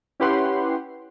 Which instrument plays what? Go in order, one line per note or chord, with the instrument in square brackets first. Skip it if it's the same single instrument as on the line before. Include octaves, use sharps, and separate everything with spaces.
[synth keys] C#4 E4 G4 B4 F#5 C6